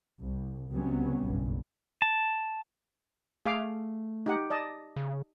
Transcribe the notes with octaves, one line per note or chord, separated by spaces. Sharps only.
C2
C#2 C3 F#3 G3 B3 C#4
F#1 B1 G2
A5
A3 G#4 F5 D6
D#4 G4 F#5
D5 D#5 A5
C#3